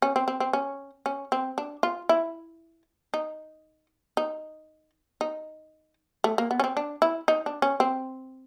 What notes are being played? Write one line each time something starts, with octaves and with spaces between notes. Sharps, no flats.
C#4
C4
C4
C4
C#4
C#4
C4
D4
F4
E4
D#4
D#4
D#4
A3
A#3
B3
C#4
C4
D4
E4
D#4
D4
C#4
C4